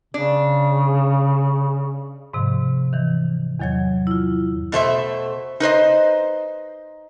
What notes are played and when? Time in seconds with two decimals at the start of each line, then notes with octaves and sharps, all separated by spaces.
0.14 C#3 D4
2.33 G#2 C3 D#3 F3
2.93 D#3 E3
3.59 E2 D#3 F#3 C#5 G#6
4.07 E4 F4
4.72 B2 A3 C5 E5
5.60 D#4 B4 C5 D#5